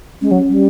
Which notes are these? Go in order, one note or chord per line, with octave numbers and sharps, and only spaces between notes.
G#3 C#4
F#3
G3